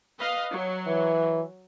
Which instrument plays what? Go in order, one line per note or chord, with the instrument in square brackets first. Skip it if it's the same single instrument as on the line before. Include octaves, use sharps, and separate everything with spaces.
[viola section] B4 D#5 F5
F#3
[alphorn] E3